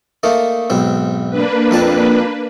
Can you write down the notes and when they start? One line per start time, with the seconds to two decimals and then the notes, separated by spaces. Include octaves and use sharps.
0.23 A3 A#3 D#4
0.70 B1 G#2 C4
1.30 A#3 D4 B4
1.71 F2 C4 A5